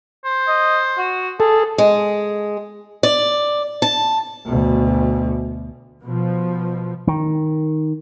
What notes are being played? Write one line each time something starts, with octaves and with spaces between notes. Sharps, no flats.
C5
D#5
F#4
G#4 A4
G#3
D5
A5
D2 B2
B2 F3
D#3